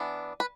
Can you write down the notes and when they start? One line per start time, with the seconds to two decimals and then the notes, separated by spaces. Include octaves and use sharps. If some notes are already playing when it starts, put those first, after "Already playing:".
Already playing: E3 B3 D4
0.40 B4